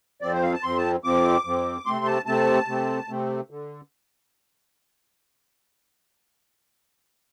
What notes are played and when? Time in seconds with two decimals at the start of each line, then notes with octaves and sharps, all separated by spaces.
0.22 F2 F3 C4 D5
0.33 C5
0.42 F5
0.53 A5
0.63 F2 F3 C4 C6
0.77 A5
1.04 F2 F3 C4 D6
1.45 F2 F3 C4
1.86 C3 A3 C4 C6
2.05 A5
2.26 C3 A3 C4 A5
2.67 C3 A3 C4
3.09 C3 A3 C4
3.50 D3